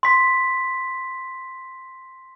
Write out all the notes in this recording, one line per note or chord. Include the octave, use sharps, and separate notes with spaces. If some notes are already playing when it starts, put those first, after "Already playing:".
C6 B6